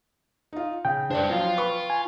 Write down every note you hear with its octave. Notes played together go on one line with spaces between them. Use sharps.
D#4 F4
C#3 G5
D4 B4 C5 D5 F#6
F3 F#3 F4 F5
B4 B5 C#6
G#5